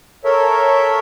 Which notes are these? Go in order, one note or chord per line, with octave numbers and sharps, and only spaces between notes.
A4 A#4 C#5 E5